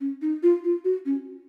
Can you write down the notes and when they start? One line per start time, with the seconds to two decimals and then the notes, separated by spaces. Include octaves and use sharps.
0.01 C#4
0.22 D#4
0.43 F4
0.64 F4
0.84 F#4
1.06 C#4